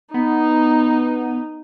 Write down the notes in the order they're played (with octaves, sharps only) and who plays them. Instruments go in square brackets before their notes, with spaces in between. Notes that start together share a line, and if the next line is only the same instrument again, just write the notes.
[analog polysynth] B3 [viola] D#4